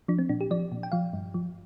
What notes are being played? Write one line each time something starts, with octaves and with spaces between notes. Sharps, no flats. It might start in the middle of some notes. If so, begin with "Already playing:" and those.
F3 D4
C4
A#2 D4
G4
F3 D5
A#2
G5
F3 F5
G2
F3